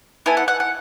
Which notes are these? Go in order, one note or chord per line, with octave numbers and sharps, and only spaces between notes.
B3 E4 A4 G#5
F#5
F#5
F#5